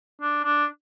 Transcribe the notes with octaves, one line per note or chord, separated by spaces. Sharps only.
D4
D4